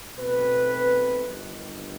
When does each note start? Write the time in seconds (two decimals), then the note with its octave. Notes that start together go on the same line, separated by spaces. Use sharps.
0.17 B1 B2 A3 C4 B4
1.24 G1 G2 D#3